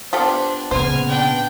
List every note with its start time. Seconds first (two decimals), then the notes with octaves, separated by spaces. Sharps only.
0.13 B3 D4 F4 G4 A4 C5
0.71 A#2 C#3 B3 C5 G#5 F6
1.08 D4 G5